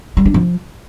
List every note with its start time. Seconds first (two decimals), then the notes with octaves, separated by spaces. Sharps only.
0.17 G3
0.26 D4
0.34 F3